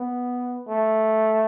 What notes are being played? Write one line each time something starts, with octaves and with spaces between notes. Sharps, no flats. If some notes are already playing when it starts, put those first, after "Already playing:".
Already playing: B3
A3